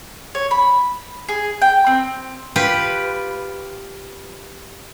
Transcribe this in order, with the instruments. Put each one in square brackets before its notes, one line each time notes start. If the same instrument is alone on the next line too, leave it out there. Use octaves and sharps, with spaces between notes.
[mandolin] C#5
B5
G#4
G5
C4
[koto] F4 G4 B4